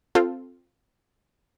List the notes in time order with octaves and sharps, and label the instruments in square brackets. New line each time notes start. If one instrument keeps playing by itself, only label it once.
[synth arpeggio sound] C4 F4 A4